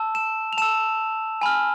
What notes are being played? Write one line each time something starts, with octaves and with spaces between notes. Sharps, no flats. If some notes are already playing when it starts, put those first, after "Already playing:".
Already playing: A5 E6
E7
F7
A5 E6 E7
G#5 B5 F6